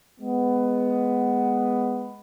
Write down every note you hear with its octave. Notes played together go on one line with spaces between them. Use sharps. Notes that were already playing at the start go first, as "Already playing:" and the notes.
G#3 B3